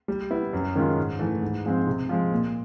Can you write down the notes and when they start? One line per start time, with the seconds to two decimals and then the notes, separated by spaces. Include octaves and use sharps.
0.08 G3
0.31 B3 E4
0.53 F#2
0.75 D#3 G#3 C#4 F4
0.98 G#2
1.19 E3 A3
1.42 G#2
1.65 F3 G#3 C4
1.87 C3
2.09 F3 G#3
2.31 A#2